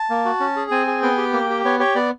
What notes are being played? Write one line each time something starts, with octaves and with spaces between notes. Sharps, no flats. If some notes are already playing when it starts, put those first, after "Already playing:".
Already playing: A5
A#3
F#4
C#4
G#4
C4 G#5
G#4
B3 G5
G4
A#3
G4
B3 C#5
G4 C#5
B3 D5